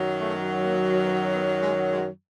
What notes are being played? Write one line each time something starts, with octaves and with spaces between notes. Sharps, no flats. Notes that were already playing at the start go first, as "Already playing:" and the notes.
Already playing: F#2 D#3 F#3
A3
A#3
B3
B3
G#3
G#3